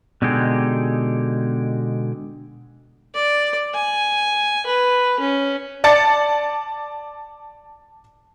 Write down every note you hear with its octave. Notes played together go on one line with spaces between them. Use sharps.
B2 D3 G#3 D#4 G4 G#4
D5
G#5
B4
C#4
D5 A5 A6 C#7